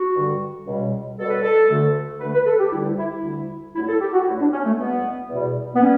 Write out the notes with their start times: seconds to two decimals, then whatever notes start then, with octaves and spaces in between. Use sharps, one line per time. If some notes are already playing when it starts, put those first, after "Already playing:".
Already playing: F#4
0.15 G2 D3 G3
0.66 C#2 B2 G3
1.18 C#2 B2 G3 A4
1.29 B4
1.42 A4
1.69 D2 D3 A3
2.20 D2 D3 A3 B4
2.34 B4
2.46 A4
2.59 G4
2.72 D2 D3 G3 E4
2.98 E4
3.11 E4
3.24 D2 D3 G3
3.75 G2 F#3 A3 E4
3.88 A4
4.01 G4
4.13 F#4
4.27 G2 F#3 A3 E4
4.40 D4
4.53 C#4
4.65 A3
4.78 E2 B2 G3 B3
5.29 E2 B2 G3
5.76 B3
5.81 G3 C#4